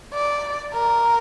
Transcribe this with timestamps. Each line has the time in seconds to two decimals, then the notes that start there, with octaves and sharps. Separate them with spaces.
0.14 D5
0.73 A#4